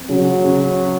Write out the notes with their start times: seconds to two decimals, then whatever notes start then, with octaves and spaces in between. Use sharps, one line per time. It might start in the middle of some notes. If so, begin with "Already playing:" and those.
Already playing: C4
0.09 C#3 F#3
0.44 C#3